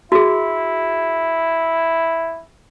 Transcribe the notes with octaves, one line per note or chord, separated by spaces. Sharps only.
E4 F#4 G#4